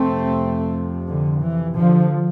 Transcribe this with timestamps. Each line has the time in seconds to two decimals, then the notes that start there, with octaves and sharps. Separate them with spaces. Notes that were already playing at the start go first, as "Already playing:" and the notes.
Already playing: F2 C3 A3 C4
1.08 D3
1.42 E3
1.77 D3 F3